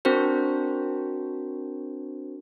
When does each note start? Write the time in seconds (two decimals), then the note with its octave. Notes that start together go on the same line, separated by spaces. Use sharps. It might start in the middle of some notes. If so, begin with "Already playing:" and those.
0.05 C4 D4 F#4 A#4 C5